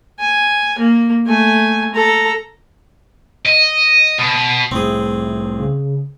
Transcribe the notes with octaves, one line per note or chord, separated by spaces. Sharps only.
G#5
A#3
A3 G#5
A4 A#5
D#5
B2
C2 A2 C4 G#4
C#3